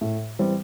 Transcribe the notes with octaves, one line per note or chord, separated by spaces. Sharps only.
A2
E3 G3 C4